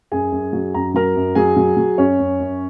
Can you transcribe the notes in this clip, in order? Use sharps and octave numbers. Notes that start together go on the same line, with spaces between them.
F#2 G#4 G#5
F#2
F#3
F#2 A#5
F#3 A#4 A#5
F#2
F#3 G#4 G#5
F#3
F#3
F#2 C#4 C#5
F#2
F#2